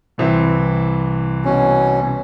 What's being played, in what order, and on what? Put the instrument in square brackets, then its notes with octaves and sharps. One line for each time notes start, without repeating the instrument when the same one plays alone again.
[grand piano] C2 E3 C4
[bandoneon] B2 C#4